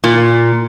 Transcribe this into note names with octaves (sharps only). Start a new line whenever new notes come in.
A#2